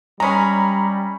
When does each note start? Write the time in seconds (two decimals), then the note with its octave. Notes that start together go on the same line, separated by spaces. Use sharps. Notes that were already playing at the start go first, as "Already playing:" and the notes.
0.20 G3 G#3 C#4 A#5 B5